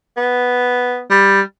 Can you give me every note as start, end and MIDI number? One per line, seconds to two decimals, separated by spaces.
0.17 1.01 59
1.10 1.40 55